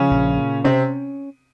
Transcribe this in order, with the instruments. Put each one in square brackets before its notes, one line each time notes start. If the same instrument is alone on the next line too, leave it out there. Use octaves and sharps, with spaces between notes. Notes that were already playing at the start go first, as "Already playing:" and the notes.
Already playing: [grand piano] C#3 C#4 [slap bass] F3
[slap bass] A#1
A#2
[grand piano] C3 C4 [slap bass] C#4